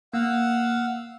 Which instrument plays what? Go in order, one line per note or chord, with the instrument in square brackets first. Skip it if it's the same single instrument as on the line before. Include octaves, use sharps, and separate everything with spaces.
[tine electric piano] A#3 [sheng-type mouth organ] F5 F#5 E6